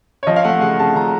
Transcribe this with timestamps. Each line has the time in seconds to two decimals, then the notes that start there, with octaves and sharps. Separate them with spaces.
0.23 C#5
0.27 F3 D#5
0.36 F5
0.44 A3 F#5
0.61 C#3 F#5
0.79 C#3 A5
0.96 F3 A#5